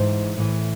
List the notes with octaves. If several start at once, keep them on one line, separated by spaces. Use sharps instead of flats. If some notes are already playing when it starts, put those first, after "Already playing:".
Already playing: G#2 E3 C5
A2 E3